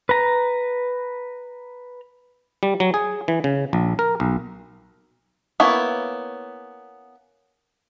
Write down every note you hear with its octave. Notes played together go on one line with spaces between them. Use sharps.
B4 A#5
G3
F#3
G#4
E3
C#3
A#1
A#4
B1
A#3 B3 C#4 E4